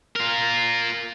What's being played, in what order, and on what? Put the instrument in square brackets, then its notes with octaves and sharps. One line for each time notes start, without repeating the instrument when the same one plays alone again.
[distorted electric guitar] F4 A#4